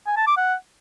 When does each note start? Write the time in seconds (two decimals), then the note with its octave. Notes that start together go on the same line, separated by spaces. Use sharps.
0.07 G#5
0.17 A5
0.27 D6
0.37 F#5